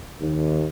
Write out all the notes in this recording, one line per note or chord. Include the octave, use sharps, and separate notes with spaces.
D#2